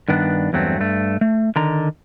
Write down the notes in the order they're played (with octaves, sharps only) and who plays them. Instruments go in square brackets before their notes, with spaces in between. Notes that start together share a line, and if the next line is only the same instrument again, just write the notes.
[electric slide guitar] G2 D#3 B3 D4
E2 G2 F#3 A3 C4
G2 A3
A3
D3 D#3 A#5